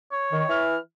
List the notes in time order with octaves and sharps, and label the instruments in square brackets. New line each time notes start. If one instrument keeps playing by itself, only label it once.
[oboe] C#5
[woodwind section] D#3
E3 E4 F6